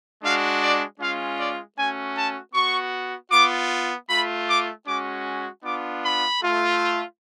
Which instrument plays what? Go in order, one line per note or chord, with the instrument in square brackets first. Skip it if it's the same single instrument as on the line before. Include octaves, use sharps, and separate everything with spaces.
[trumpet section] G#3 D4 F#4 F5
D5
G#3 C#4 F4 F5
D5
A3 C#4 F#4 G#5
A5
B3 F#4 C#6
B3 F4 D6
A3 F4 B5
D6
G#3 C#4 F#4 D6
B3 D4 F4 D6
B5
A3 F4